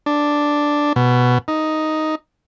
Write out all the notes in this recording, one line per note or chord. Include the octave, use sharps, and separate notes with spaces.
D4
B2
D#4